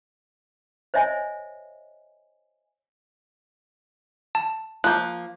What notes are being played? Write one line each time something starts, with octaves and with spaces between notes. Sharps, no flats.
C5 C#5 D#5 E5 G#5
A5
F3 A#3 F#6 G6